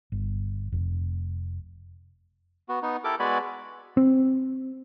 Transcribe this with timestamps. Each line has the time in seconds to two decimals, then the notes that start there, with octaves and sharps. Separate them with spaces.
0.12 G1
0.72 F1
2.69 B3 F#4
2.82 B3 D#4
3.04 E4 G4 A4 A#4 D6
3.19 G#3 B3 F#4 D5 G#5 B5
3.97 C4